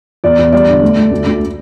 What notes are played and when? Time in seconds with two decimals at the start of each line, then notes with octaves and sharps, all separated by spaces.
0.24 E2 D5
0.39 E2
0.52 G3 D5
0.68 D3
0.82 A3
0.97 A3
1.11 D2
1.26 D2